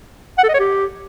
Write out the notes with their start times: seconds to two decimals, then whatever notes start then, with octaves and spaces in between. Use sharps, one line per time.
0.38 F#5
0.43 A4
0.49 D#5
0.54 C#5
0.60 G4